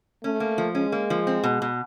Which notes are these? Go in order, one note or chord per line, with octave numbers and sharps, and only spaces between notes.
A3 C#4
A#3
F3
G#3 C#4
A#3
F3
C4
B2
B2